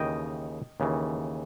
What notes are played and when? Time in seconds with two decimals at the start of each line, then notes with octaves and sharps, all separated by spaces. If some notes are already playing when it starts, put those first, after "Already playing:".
Already playing: D#2 C#3 E3 D#5 G5
0.80 D#2 C#3 E3